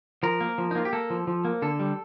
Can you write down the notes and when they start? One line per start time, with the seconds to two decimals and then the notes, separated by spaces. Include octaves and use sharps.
0.23 F3 A#4
0.40 A#3
0.58 F3
0.71 D#4
0.75 A#3 F4
0.85 G4
0.93 A#3 A4
1.10 F3
1.27 F3
1.45 A#3
1.62 D3 A4
1.80 G3